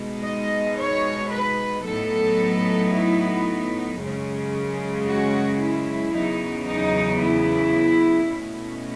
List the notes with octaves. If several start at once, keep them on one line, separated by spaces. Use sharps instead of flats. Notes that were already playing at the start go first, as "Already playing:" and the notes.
Already playing: B2 G#3 D#4
D#5
C#5
B4
A2 F#3 B3 D#4 A4
E4
F#2 C#3 G#3 C#4
F#4
E4
E2 C#3 F#3 B3 D#4
D#4
E4
B2 A3 C#4